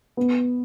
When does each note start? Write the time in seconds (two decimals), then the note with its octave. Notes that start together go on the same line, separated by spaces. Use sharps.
0.17 B3